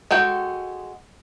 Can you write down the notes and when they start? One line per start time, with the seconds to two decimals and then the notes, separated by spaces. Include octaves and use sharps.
0.11 G#3 F#4 A4 G5